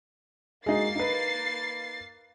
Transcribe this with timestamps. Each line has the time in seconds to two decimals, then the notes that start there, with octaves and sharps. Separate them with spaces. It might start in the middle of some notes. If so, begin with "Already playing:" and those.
0.66 G#3 A#3 D#4 F#4 A6 C7
0.96 D#4 B4